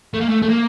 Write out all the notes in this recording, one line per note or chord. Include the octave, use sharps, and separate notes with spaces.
A3
A#3
A3
A3
A#3